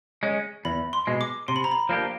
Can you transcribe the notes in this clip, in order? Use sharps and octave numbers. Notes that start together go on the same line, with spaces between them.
G#3 C#4
E2 B5
C6
B2 G#3
D6
C3 C6
B5
A#5
B5
F3 A#3 D4 G4